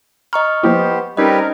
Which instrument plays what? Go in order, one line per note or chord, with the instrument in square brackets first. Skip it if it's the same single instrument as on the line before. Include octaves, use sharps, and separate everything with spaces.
[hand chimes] D#5 C#6 F6 [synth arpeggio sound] A#5
[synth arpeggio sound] F3 A#3 E4 [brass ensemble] B3 C5 [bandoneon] G4
[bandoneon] G3 G4 B4 [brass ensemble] C4 A#4 [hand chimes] C#4 D#4 D#5